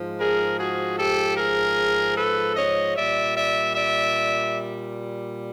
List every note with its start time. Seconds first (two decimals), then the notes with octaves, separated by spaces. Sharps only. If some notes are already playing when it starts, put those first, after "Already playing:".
Already playing: G#2 F3
0.19 G#4 A#4
0.58 F#4 G#4
0.98 G4 A4
1.37 G#4 A#4
2.17 A4 B4
2.56 C#5 D#5
2.95 A#2 G3 D5 E5
3.35 D5 E5
3.75 D5 E5